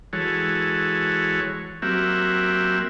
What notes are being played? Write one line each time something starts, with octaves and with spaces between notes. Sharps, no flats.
E3 G#3 F#4 A4 C#5
F#3 A#3 C4 F#4 G4 E5